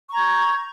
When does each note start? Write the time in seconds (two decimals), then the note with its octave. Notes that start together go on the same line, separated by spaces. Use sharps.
0.09 C#6
0.12 A#5
0.15 G#6
0.19 G6